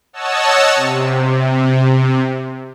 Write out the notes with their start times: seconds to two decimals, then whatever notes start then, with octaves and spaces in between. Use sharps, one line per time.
0.13 C#5 D#5 F#5 A5 E6
0.76 C3